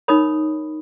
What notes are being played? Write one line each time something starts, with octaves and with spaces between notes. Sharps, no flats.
D#4 A#4 C#5 B5 D#6